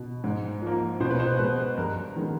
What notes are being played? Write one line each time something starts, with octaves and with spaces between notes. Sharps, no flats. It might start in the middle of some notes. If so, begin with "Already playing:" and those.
Already playing: B2
G#2
F3 A#3
B2 C5
B4
C5
G#3 B3 B4
G2 A#4
D#3 G#3 B3